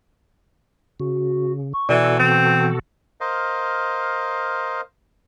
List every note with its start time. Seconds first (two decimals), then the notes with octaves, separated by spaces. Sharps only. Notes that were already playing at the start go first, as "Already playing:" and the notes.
1.00 C#3 F#4
1.74 C#6
1.89 B2 E3 F#4 A4 D5
2.19 E3 C4
3.21 A#4 C5 D#5 F5